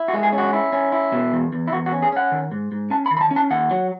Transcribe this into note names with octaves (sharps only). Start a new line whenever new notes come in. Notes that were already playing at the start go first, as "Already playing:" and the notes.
Already playing: E4
F#4
G#3
G#4
C#4
F#4
E4
C#4
E4
B2
E2
E2
E4
E2 F#4
F#4
C#4
G#4
C#4 F#5
D#3
G#2
G#2
C#4 A5
B5
D#3
B5
A5
C#4
A5
D#2 F#5
F#3